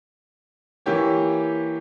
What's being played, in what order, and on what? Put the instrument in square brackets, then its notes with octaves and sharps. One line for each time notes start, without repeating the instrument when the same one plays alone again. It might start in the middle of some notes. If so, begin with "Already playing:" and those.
[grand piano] E3 A#3 G4 C#5